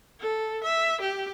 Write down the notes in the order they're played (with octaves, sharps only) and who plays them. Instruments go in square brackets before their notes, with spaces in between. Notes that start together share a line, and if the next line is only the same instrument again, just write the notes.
[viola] A4
E5
G4